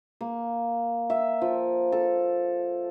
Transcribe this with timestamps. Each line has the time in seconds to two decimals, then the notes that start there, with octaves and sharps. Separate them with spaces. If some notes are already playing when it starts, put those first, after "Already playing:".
0.21 A#3
1.10 E5
1.41 F3
1.92 A4